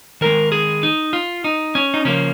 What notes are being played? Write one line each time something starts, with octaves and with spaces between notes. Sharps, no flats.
D#3 G#3 A#4
G#4
D#4
F4
D#4
C#4
D#4
C#3 F3 A#3 C#4